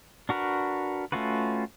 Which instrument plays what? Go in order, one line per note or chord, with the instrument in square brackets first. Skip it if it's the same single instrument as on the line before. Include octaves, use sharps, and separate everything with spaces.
[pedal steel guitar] D4 F#4 A#4 B4
A3 C#4 F4 F#4 B4